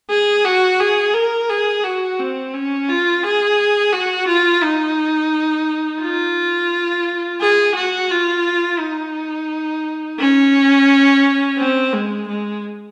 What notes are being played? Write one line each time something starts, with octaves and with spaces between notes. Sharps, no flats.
G#4
F#4
G#4
A#4
G#4
F#4
C4
C#4
F4
G#4
F#4
F4
D#4
F4
G#4
F#4
F4
D#4
C#4
C4
G#3
G#3